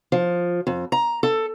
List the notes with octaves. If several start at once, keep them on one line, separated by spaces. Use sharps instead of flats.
F3
F2
A#5
A4